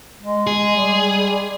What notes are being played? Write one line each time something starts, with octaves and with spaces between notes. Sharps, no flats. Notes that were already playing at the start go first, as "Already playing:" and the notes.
G#3
G#4
G3